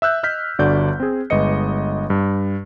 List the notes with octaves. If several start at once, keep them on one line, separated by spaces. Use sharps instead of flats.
E5 E6 F#6 G6
D#5 F6 G6 B6
G1 D3 F#4 D5 G6
C4 G#4
G1 G#3 B4 D#5 C#7
G2